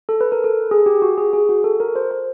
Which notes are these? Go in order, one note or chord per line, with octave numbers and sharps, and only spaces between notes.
A4
B4
A#4
A4
G#4
G4
F#4
G#4
G#4
F#4
A4
A#4
C5
C5